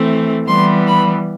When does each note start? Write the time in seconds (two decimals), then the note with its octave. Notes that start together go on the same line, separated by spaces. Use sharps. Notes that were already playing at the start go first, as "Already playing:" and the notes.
Already playing: E3 A3 C4
0.48 E3 G3 B3 C6
0.87 B5